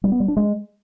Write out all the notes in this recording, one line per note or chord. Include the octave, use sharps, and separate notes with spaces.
G3
B3
G3
D4
G#3